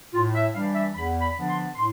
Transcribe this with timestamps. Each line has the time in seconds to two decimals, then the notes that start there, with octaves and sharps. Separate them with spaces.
0.14 A2 F4
0.35 E5
0.54 E3 G3 D4 F5
0.75 E5
0.95 E2 B5
1.21 B5
1.36 D3 F3 B3 D4
1.48 C6
1.75 A2 C6